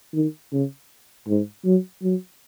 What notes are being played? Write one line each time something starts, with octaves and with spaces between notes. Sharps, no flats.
D#3
C#3
G#2
F#3
F#3